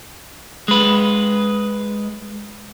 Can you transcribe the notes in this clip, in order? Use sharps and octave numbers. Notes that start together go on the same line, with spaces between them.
G#3 B4